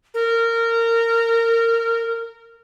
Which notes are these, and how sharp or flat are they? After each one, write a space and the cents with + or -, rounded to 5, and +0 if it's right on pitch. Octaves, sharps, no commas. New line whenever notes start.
A#4 -20